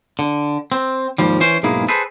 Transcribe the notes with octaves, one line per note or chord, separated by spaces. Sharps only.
D3
C4
D#2 G#2 F3 G3
E3 C#4 C5
B1 G#2 G#3 A#3 E4 G#4
G#4 A4 B4 C5